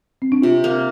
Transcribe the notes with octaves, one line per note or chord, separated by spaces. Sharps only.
C4
D4
C3 F4
A#3